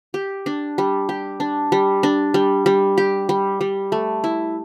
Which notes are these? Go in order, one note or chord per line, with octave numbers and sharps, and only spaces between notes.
G4
D4
G3
G4
D4
G3
D4
G3
G3
G4
G3
G3
A3
E4